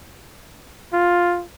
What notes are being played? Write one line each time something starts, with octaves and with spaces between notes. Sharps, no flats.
F4